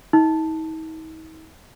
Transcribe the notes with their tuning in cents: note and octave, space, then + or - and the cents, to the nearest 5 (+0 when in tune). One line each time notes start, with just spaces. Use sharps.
D#4 +45